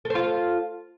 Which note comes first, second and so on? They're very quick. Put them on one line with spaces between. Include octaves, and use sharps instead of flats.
A4 C5 F4